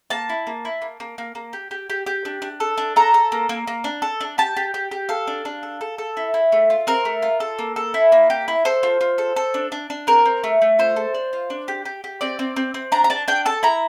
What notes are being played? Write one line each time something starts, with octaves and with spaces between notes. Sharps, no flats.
A#3 A5
E4
A#3
E4
A#3
A#3
A#3
A#3
G4
G4
G4
G4
D4
D4
A4
D4
A4 A#5
A4
A#3
A#3
A#3
D4
A4
D4
G4 A5
G4
G4
G4
A4 F5
D4
D4
A4
A4
A4
E4
E4
A3
F4
C4 A#4
A3
F4
A4
A#3
A4
E4
A#3
G4
E4
A4 C5
F4
F4
A4
A4
D4
D4
D4
C4 A#4
C4
A3
A3
F4 C5
A4
D4
F4
D4
G4
G4
G4
C4 D5
C4
C4
C4
D4 A#5
A#5
D4 A5
D4 G5
A4 A5
E4 A#5